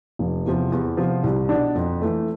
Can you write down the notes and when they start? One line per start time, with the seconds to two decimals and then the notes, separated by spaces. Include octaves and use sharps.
0.19 F1
0.46 E2 C3 F3
0.72 E2
0.97 C3 F3 B3 F4
1.24 C2
1.49 B2 B3 D4
1.75 F2
2.02 E3 A3